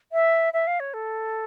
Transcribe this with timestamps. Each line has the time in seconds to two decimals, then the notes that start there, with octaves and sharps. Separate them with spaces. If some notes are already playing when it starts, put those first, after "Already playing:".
0.12 E5
0.53 E5
0.67 F5
0.80 C#5
0.94 A4